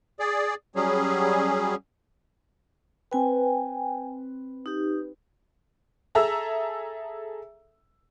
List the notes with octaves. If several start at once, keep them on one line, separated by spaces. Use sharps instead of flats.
G#4 D5
F#3 G3 C#4 G#4
C4 B4 G5 G#5
D#4 G4
G#4 A4 E5 A#5 E6